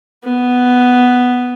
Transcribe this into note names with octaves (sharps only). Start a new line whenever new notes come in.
B3